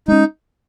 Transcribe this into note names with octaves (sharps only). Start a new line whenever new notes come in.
G#3 C#4 D#4